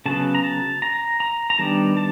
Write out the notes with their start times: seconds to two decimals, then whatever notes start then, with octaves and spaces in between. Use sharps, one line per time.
0.06 C#3 F#3 B3 A5
0.35 A#5
0.44 A5
0.82 A#5
1.20 A#5
1.50 A#5
1.59 D#3 G3 B3 D4 A5
1.97 A5